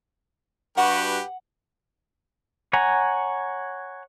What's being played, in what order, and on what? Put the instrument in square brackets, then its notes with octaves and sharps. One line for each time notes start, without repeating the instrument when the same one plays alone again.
[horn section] G2 F#4 [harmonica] G4 B4 [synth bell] F#5
[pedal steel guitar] C#5 F#5 G#5 A#5